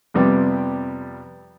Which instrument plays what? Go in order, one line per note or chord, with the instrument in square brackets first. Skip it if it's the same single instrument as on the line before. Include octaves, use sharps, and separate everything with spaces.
[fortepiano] F2 C3 G3 B3 G5 D6